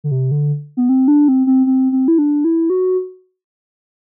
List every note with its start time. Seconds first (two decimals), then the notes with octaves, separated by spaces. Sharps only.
0.04 D3
0.11 C3
0.31 D3
0.77 B3
0.89 C4
1.08 D4
1.28 C4
1.47 C4
1.67 C4
1.92 C4
2.08 E4
2.18 D4
2.44 E4
2.70 F#4